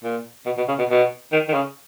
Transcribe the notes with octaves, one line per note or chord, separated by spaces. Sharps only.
A#2
B2
B2
C#3
B2
B2
D#3
D#3
C#3